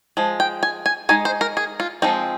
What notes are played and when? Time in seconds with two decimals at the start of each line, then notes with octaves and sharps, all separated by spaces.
0.17 F3 G#3
0.40 G5
0.63 G#5
0.86 G#5
1.09 G#3 D#4 G#5
1.25 C5
1.41 A#4
1.57 G#4
1.80 F4
2.02 F3 G#3 C4 D#4